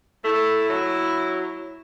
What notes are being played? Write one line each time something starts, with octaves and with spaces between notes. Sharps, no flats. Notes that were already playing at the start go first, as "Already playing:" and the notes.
A3 E4
F#3